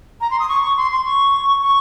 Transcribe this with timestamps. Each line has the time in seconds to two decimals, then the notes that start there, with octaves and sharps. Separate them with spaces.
0.21 A#5
0.31 C6
0.40 D#6
0.49 C#6
0.63 C#6
0.77 C6
0.91 C6
1.05 C#6
1.62 C#6